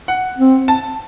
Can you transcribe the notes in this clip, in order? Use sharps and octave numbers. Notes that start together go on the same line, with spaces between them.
F#5
C4
A5